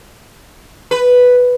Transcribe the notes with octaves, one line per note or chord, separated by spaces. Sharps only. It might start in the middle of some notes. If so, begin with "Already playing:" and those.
B4